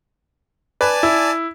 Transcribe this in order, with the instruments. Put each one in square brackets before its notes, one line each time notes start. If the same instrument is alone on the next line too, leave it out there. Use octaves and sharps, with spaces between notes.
[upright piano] B4 [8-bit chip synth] D5 G#5 A5
[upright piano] E4